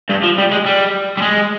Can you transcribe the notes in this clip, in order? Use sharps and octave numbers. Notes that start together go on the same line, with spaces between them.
G2
F3
G3
G#3
G3
G3
G#3